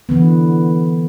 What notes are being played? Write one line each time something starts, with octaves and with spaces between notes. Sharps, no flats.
D3 E3 B3